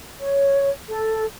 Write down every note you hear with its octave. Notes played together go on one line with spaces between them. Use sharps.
C#5
A4